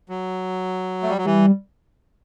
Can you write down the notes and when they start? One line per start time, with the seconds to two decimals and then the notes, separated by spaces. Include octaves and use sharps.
0.09 F#3
1.03 A3
1.10 G3
1.18 F#3
1.25 E3 G3